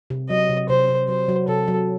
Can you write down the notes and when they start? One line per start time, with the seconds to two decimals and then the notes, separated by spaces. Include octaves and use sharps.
0.10 C3
0.30 F#3 D#5
0.49 C3
0.69 C3 C5
0.89 C3
1.09 F#3 C5
1.29 F#3
1.48 C3 A4
1.68 F#3